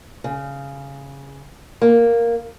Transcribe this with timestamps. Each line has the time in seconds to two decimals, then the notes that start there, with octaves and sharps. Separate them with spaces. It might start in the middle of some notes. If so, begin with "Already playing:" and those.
0.24 C#3
1.82 A#3